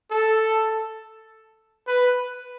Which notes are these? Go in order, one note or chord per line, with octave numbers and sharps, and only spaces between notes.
A4
B4